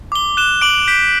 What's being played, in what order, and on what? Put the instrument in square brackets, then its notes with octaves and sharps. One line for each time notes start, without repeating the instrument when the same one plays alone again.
[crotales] D6 G7
F#6 E7 G7
D6 D7 F#7
G6 B6 D7